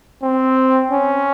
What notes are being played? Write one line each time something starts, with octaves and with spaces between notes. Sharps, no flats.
C4
C#4